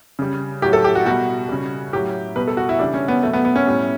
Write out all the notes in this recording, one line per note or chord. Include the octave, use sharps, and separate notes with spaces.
C#3 G3
A2 F#3 G4
A4
G4
F#4
B2 G3 F#4
C#3 G3
A2 F#3 G4
B2 G3 B4
A4
F#4
E4
C#3 E3 G3 D4
C#4
B3
B2 F#3 A3
B3
B3
C#4
A2 G3